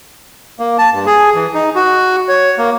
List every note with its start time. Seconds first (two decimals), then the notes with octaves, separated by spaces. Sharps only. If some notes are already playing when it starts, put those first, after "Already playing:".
0.59 A#3
0.78 A5
0.93 G2
1.06 G#4
1.35 E3
1.54 D#4
1.75 F#4
2.29 C#5
2.58 A#3